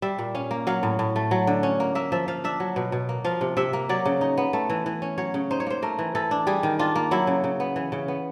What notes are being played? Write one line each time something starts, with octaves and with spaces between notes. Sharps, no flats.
G3 E5
A#2
C#4 F5
A#3
F#3 F5
A2
A2
A3
F#3
D3
C#4
A#3
A#3 E5
F3 E5
F3 F5
D4 E5
F#3
B2
B2
A#3
F3 F5
C3
C3 E5
A#3
F#3 D5
C#3
D#4
B3
A3
E3
E3
C#4
F#3 C#5
C#3
D#4 C5
C#5
A#3 C5
A3 A#4
E3
E3 A4
D4
G3 G#4
D#3
D4 F4
A#3
F#3 E4
C#3
C#3
B3
E3
C#3
B3